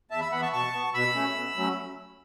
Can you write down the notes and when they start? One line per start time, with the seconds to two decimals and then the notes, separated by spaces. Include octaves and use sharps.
0.10 E2 E5 A5
0.21 B5 E6
0.32 E3 B3 F#5 B5
0.42 A5 C#6
0.52 B2 A5 C#6
0.73 B3
0.94 B2 B5 E6
1.15 A3 C#4
1.35 B2
1.57 F#3 A3 C#4